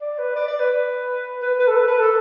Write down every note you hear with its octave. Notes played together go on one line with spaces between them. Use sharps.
D5
B4
D5
D5
B4
B4
B4
A4
B4
B4
A4